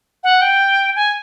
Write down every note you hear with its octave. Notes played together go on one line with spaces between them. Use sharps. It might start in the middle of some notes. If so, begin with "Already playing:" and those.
F#5
G5
G#5